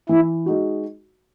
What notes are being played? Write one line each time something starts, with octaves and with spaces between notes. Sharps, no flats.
E3 E4
G#3 D#4 F#4